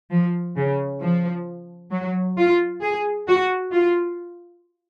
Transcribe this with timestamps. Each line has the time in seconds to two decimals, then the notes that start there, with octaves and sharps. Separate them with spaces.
0.11 F3
0.56 C#3
1.01 F3
1.92 F#3
2.38 F4
2.82 G#4
3.27 F#4
3.73 F4